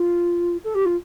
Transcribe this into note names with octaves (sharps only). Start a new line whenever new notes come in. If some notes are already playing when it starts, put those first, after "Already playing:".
Already playing: F4
A4
G4
F4